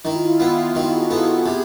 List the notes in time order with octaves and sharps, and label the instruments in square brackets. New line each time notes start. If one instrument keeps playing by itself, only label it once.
[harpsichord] D#3 [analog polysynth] E4
[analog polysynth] F4
E4
[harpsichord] B3 [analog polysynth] F4
[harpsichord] D#3 [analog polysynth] F#4
[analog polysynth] G#4
[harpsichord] B3 [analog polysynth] A4
[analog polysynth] A4
[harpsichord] C3 [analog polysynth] G#4